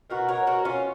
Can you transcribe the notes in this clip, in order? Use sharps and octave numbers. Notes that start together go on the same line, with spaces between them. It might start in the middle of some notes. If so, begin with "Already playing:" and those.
B2 F#3 F#4 A#4
A#4 C#5
F#4 A#4
C#4 F4